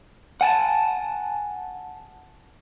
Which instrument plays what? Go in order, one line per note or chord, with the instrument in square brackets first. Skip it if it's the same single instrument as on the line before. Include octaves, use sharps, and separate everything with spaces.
[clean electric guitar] F#5 G#5 A5